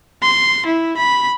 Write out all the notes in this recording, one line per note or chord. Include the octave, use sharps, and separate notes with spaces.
C6
E4
B5